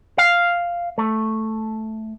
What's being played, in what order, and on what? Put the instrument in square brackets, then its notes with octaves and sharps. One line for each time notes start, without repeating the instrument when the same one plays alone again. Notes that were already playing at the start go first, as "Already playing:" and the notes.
[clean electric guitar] F5
A3